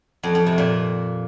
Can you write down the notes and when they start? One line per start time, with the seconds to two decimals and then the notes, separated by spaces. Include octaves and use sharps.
0.23 F2
0.35 F2
0.46 C3
0.58 A#2